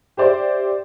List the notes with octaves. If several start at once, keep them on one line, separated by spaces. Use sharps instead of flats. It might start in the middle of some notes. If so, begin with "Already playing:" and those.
G4 C5 D5 E5